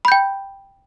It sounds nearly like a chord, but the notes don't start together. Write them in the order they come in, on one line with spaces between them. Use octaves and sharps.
B5 G6 G5